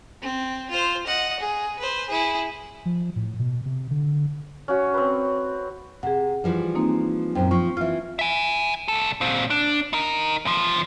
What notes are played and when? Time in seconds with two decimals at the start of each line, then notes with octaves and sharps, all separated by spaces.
0.21 C4
0.70 F4 C5
1.07 D#5 F#5
1.40 G#4
1.79 B4 C5
2.09 E4 G#4
2.85 F3
3.16 A2
3.39 B2
3.66 C3
3.91 D3
4.68 C#4 F#4
4.94 C4 B4
6.03 C3 G#4 F#5
6.44 E3 F3 G3
6.75 A#3 C4 D#4
7.35 F#2 A#2 C4 C5 G5
7.51 F3 C#6
7.77 E3 F4 E5 F6
8.19 E5 G#5
8.88 C2 A4
9.21 A#2 C4
9.50 D4
9.93 D#4 A#4
10.45 E2 F3